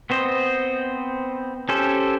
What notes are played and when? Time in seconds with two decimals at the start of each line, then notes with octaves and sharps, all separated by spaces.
0.10 B3 C4 C5 D#5
1.69 C#4 G4 A4 C5